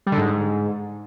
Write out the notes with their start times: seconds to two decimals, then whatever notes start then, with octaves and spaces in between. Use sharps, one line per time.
0.06 G3
0.12 D3
0.17 G#2